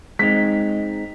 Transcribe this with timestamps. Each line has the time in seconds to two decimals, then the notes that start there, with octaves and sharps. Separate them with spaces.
0.19 G#3 C4 D#4 B6